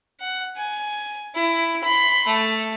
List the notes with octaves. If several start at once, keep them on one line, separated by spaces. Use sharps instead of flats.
F#5
G#5
E4
B5 C6
A3